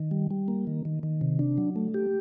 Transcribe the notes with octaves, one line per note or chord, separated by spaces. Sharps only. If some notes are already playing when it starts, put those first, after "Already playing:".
Already playing: D#3
G3
G3
A#3
D#3
D#3
D#3
C3
D4
F#3
A3
G4